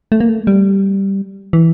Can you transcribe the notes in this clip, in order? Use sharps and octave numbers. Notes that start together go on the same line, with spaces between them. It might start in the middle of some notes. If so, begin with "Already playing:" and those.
A3
A#3
A3
G3
E3